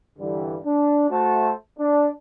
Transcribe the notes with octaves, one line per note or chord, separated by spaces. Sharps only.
G2 D3 E3 G3
D4
A3 F#4 C5 A5
D4